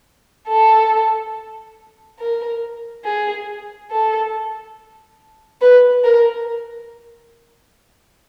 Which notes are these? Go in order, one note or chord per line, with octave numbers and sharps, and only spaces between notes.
A4
A#4
G#4
A4
B4
A#4